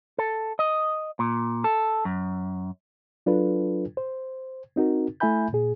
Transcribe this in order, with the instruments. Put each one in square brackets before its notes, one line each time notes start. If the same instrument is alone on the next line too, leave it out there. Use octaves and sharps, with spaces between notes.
[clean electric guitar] A4
D#5
A#2
A4
F#2
[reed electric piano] F#3 D4 F4 A4 B4
C5
C4 D#4 F#4 A#4
A3 E4 E5 G#5 B5 G6
A#2 G#4